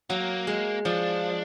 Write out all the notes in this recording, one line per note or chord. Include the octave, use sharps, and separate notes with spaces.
F#3 A#3
G#3
F3 D4